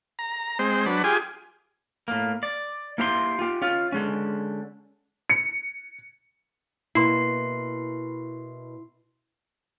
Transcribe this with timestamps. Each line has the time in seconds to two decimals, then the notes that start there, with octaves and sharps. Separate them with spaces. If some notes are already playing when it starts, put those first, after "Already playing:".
0.19 A#5
0.59 G#3 C4 C5
0.86 F#3 D4 B4
1.04 F4 G4 G#4 G#5
2.08 A2 A#3
2.43 D5
2.98 A#3 E4 G4 C5 A#5 C6
3.39 F4 G4
3.62 C#4 F4
3.92 D3 G#3 C#4
5.30 C#7
6.95 B2 A#3 E4 C6 C7